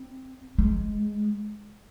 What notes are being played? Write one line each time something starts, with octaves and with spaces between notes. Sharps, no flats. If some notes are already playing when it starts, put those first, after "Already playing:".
Already playing: C4
G#3